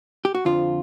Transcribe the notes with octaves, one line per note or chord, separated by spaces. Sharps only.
G4
F#4
F2 D3 F3 F4